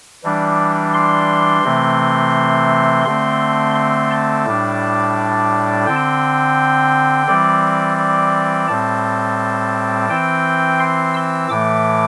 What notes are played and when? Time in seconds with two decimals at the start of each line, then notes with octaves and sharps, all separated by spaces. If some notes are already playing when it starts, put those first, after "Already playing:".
0.24 E3 G3 D4
0.94 C6
1.64 C3 E3 A3 C4
3.05 D3 A3 C4 C6
3.75 C6
4.11 A5
4.45 A2 G3 D4
5.86 D3 C4 G5
7.27 E3 G3 C4 D5
7.98 D5
8.68 A2 G3 C4 A5
10.09 E3 C4 G5
10.79 C6
11.14 E6
11.49 A2 E3 A3 D6